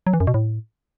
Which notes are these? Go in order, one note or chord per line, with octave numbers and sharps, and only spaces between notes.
F#3
E3
F#2
B2
A2